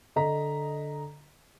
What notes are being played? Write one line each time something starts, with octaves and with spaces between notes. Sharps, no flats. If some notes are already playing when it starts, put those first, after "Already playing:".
D3 D#5 A#5 B6